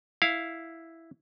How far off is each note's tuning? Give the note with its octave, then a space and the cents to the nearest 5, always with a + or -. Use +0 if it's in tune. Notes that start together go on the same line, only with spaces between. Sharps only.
E4 +0 F5 +0